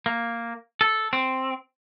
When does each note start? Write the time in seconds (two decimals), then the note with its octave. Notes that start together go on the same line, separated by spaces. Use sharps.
0.06 A#3
0.81 A4
1.13 C4